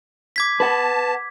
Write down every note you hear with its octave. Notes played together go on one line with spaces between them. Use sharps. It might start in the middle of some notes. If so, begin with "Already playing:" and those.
D6 G#6 B6
B4 F#5 A5